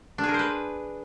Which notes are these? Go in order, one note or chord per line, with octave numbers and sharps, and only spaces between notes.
D4
G#4
A#4
C5
B4